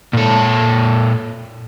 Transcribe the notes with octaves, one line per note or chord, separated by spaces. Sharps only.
A#2 A4